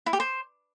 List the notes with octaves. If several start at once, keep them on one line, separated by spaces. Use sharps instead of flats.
E4
G4
C5